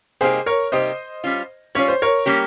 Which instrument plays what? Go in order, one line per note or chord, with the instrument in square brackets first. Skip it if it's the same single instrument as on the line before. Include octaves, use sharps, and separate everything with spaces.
[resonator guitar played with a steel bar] C3 G3 A#3 D#4 G4 [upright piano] G#4 C5
[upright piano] A#4 C#5
[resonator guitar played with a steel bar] C3 G3 A#3 D#4 G4 [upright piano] C5 D#5
[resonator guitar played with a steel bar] G3 C#4 F4
[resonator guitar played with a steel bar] G3 C#4 F4 [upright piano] C#5
[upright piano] C5
A#4 C#5
[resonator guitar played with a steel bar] G3 A#3 C#4 G4